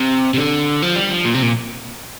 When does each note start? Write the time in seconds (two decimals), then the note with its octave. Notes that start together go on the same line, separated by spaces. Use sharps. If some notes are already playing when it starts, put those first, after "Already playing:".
Already playing: C3
0.34 C3
0.37 D3
0.82 F3
0.96 G3
1.11 F3
1.25 A#2
1.34 C3
1.43 A#2